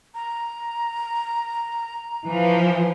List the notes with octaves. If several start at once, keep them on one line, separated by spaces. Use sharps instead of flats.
A#5
E3 F3